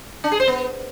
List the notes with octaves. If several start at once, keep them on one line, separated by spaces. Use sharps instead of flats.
D4
G#4
C5
B3